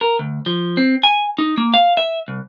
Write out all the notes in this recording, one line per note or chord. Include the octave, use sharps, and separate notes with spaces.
A#4
D2
F3
C4
G#5
D#4
A#3
F5
E5
C2